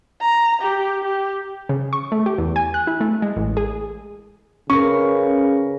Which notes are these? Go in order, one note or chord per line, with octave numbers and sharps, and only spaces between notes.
A#5
G4
G4
C#3
C#6
A3
G4
E2
G#5
F#6
E4
A3
G#3
A1
G#4
C#3 C#4 A#4 B4 C#6